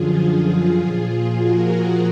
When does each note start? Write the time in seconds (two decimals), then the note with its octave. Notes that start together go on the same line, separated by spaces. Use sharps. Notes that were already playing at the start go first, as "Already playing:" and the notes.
Already playing: F#2 D3 F3 F4 G#4
0.80 A#2 F3
1.35 F#4 A#4